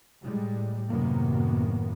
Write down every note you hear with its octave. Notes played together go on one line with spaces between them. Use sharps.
A2 G3 G#3
F#2 A2 C3 D#3 A#3 B3